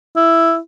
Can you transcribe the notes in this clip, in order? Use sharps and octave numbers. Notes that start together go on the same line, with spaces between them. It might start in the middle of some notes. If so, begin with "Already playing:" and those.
E4